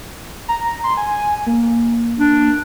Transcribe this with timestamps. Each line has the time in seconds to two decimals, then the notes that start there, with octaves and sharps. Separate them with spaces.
0.49 A#5
0.84 C6
0.97 G#5
1.46 A#3
2.19 D4